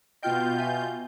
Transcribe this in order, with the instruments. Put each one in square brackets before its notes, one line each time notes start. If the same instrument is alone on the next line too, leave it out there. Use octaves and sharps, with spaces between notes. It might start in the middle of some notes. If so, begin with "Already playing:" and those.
[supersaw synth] B2 F4 G6 [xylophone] D#5 G5 F6
[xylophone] E5 G#5